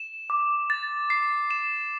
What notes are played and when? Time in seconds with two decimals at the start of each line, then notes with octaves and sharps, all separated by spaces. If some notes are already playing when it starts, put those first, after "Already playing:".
Already playing: E7
0.30 D6
0.70 A6
1.10 C7
1.51 E7